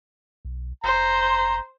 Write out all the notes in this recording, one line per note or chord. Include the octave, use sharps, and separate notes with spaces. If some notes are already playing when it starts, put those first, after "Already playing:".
B1
F1 C5 A#5